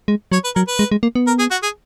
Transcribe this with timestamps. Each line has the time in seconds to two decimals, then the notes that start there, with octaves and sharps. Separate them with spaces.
0.08 G#3
0.32 F#3 C#5
0.44 B4
0.56 F#3 A#4
0.68 B4
0.79 G#3
0.92 G#3
1.03 A#3
1.15 B3
1.27 A#4
1.39 G#4
1.51 F#4
1.63 G#4